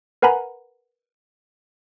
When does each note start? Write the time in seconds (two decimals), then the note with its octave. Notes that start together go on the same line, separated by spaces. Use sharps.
0.22 A#4 B4 F#5 G#5 A#5 B5